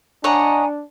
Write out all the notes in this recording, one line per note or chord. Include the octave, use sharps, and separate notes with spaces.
D4 C#5 D#5 F#5 G#5 A#5